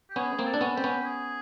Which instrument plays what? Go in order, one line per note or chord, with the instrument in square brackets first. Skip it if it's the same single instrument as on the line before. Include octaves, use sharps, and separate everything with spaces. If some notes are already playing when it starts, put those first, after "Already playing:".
[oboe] G4
[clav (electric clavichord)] B3 C#4 [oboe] G#4
[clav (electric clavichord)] A#3 C4 [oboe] G#4
[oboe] A4
[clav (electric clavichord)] D4
B3 C#4
[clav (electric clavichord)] C4 [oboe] G4
[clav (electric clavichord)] B3 C#4
[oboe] G4
G#4